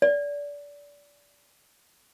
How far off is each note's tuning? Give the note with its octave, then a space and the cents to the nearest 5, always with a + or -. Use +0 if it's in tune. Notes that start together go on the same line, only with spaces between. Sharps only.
D5 -25